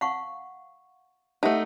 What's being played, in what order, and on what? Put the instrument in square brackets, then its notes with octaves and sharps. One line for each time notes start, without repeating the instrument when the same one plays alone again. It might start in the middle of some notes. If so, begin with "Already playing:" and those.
[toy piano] F5 F#5 C#6 [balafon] A5
[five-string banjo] A3 D#4 [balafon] G4 E5 F#5 [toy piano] A5